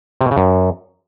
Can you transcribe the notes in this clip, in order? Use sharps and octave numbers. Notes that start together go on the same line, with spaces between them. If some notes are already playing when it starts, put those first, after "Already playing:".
C3
B2
C#3
F#2